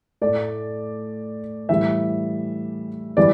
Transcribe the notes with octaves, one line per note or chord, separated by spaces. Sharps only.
A2 A3 D5
A2 E3 G3 E5
E3 G3 D5